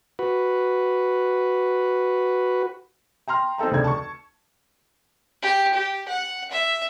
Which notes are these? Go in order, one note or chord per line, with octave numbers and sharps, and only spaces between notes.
F#4 B4
G5 A#5 C6 F6
C4 D#4 A4 G5 A#5
F1 D2 C#3 D5 G#6
A5 C#6
G4
G4
F#5
E5